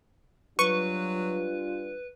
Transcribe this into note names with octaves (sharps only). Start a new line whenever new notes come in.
F#3 G3 D4 F4 B4 C#6